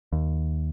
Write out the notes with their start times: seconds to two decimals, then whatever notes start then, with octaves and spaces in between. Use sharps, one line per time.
0.12 D#2